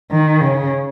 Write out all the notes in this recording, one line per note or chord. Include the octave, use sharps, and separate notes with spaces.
D#3
C#3